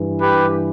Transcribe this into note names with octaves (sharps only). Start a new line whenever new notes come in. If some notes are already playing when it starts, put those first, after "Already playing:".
Already playing: G2 E3
G4 B4